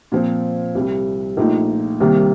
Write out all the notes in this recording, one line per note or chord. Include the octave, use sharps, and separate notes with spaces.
A#2 F3 C4
C2 C3 G3
A#1 A#2 A3 D#4
C2 C3 D#3 A#3 D#4